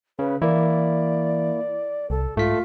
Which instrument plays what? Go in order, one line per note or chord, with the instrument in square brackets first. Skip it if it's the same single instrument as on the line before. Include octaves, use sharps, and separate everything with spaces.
[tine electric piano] C#3 [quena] B4
[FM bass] E3 [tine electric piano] A#3 E4 [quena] D5
[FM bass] C2 [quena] A4
[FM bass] G#2 [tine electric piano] A3 B6 [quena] F4